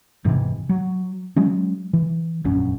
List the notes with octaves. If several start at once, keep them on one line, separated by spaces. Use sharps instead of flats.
E1 G#2 C3 E3
F#3
F#3 G#3 C#4
E3
E1 A#1 F#2 C#4